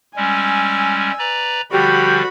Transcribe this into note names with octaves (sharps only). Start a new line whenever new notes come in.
G3 G#3 C#4 G#5 E6
B4 D5 A#5
D3 F3 G3 F#4 G4 B5